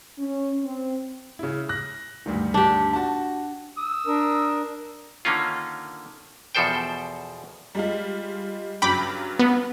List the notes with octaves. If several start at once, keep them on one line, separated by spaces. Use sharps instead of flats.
C#4
C4
C#3 E4
F#6 A#6
D2 G2 D#3
D4 G4
F#4 A5
D#6 E6
D4 A#4
D3 D#3 A#3 C#4 F4
E2 B2 F3 A4 C5 G5
G3 G#3 F4
G2 C#3 F#3 G5 B5 D6
B3